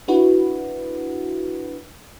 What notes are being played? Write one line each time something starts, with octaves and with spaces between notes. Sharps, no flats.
D4 E4 F#4 B4